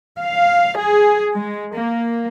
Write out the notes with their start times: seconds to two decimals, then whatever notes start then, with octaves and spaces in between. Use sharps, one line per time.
0.19 F5
0.78 G#4
1.34 G#3
1.74 A#3